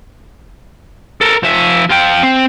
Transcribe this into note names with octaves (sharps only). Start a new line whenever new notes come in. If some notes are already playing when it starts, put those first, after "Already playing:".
A4 A#4
F3 E5
F4 G5
C4